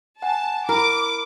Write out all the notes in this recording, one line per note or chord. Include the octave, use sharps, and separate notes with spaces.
F#5 G#5 A5
E4 A#4 B5 D6